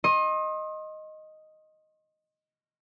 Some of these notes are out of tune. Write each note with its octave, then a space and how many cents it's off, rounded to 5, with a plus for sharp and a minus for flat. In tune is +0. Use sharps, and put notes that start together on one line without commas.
D#5 +0 C6 +40